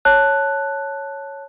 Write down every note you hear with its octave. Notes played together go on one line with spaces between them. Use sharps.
C#5 A5 F#6